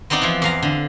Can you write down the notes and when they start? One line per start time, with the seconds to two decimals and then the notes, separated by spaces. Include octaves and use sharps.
0.10 B3 C4 D#4 D5 F#5
0.22 E3 F3
0.42 E2 F5 A#5
0.62 D3